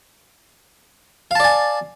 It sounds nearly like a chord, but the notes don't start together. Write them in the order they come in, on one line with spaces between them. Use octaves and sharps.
F5 A5 D5 G#5